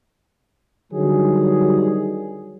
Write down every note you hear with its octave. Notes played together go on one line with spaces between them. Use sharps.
D3 D#3 F#3 G3 G#4